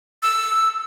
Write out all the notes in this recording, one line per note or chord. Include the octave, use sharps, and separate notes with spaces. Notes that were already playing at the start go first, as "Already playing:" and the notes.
E6